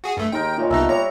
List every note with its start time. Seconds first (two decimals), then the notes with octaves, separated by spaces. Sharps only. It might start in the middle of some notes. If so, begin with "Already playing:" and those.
0.04 F#4 G#4
0.17 G2 A3
0.32 D#2 G#3 A#4 G5
0.58 A#2 C#5 D#5
0.70 C2 B3 D#4 F#4 E5 A5 A#5
0.89 G3 C#5 A#5